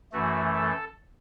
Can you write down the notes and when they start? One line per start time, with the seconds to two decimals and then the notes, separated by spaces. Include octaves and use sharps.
0.12 F#2 E3 A3 F#4
0.55 A4